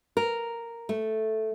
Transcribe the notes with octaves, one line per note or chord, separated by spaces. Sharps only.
A#4
A3